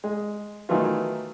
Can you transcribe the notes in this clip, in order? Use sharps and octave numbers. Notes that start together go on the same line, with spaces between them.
G#3
D#3 E3 F#3 A3 B3 F4